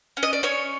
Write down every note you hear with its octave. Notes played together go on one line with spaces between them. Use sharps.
C#4
D#5
D5
C#4 C#5